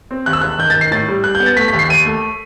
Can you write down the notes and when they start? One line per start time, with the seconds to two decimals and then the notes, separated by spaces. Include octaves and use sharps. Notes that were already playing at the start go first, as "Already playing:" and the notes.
0.11 C4
0.26 D#2 F#6
0.33 E6
0.41 E1 F#6
0.59 D#3 G6
0.70 A6
0.76 D#3
0.81 C7
0.91 A2 A6
1.08 G3
1.24 G3 F#6
1.35 G6
1.40 B3
1.46 A6
1.57 A3 B6
1.68 B6
1.73 D#2
1.79 C7
1.89 D#2 D#7
2.06 A3